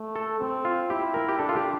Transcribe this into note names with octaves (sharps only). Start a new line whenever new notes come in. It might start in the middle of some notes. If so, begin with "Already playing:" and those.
Already playing: A3
A4
C4
F4
E4 G4
A#4
G4
D4 A4
F4
G4